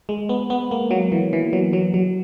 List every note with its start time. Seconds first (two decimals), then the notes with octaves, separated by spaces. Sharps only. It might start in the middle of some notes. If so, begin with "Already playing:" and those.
0.09 G#3
0.29 B3
0.50 B3
0.71 A#3
0.91 F#3
1.12 E3
1.33 E3
1.53 F#3
1.73 F#3
1.94 F#3